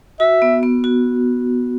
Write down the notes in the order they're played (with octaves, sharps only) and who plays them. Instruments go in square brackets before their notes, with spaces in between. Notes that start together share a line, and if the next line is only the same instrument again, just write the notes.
[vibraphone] F#4 [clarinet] E5
[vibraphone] B3
B3
F#4